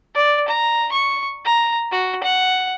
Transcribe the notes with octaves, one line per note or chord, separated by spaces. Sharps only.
D5
A#5
C#6
A#5
F#4
F#5